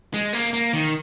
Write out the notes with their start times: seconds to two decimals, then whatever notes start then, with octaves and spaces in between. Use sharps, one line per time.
0.14 G#3
0.33 A#3
0.53 A#3
0.74 D#3